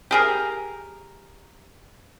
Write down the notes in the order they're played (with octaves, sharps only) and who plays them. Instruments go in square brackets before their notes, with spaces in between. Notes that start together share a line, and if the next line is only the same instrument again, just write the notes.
[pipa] G4 G#4 A#4